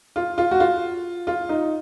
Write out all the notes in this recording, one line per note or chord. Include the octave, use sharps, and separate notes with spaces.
F4
F4
F#4
F4
F4
D#4